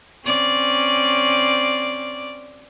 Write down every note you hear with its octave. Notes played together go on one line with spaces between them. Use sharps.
C4 C#4 D5